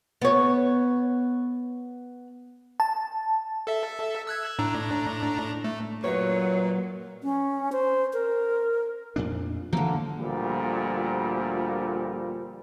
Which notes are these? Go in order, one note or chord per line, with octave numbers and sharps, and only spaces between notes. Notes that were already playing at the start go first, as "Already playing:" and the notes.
B3 C#5
A5
A4 E5
E6 F#6 G#6
A2 D4 A#5
A3
F#2 A#2 F#3 B4 C#5
C#4
C5
A#4
F2 A#2 D4
D3 E3 F3 A3 A#3
D2 A#2 F3 G3